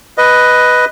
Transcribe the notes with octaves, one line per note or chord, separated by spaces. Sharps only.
B4 D#5